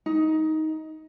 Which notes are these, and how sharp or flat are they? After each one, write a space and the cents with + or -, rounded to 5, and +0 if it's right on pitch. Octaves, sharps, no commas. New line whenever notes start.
D#4 +15